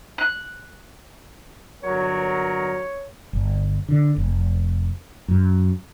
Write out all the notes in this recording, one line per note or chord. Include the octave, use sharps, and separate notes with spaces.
F#6
G1 F#3 A#4 C#5
G1
D3
F1
F#2